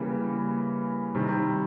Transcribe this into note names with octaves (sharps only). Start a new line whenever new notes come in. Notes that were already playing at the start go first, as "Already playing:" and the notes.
Already playing: C#3 E3 G3 A#3
C3 D#3 G3